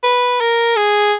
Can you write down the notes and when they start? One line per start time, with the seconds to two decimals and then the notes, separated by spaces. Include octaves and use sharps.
0.03 B4
0.40 A#4
0.76 G#4